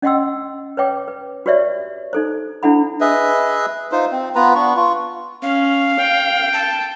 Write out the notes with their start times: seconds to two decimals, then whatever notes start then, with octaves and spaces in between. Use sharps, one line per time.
0.02 C#4 D#5 F#5 G5 C6 E6
0.77 B4 C#5 G5 D6
1.08 B4
1.46 F#4 G4 B4 C#5 D5 E5
2.13 D#4 A4 C5
2.63 D4 E4 A4 F#5 B5
3.01 G#4 B4 D#5 E5
3.92 D#4 F4 C5
4.12 C4
4.35 B3 F4 B4 A#5
4.55 B3 D4 C#6
4.77 F4 C#6
5.43 C#4 F5
5.99 G5
6.53 A5